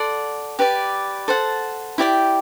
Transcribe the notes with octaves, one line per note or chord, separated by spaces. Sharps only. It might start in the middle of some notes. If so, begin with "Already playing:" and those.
Already playing: A4 D5 F#5 C6
G4 B4 D5
A4 C5 F#5 A5
E4 G4 D5 G5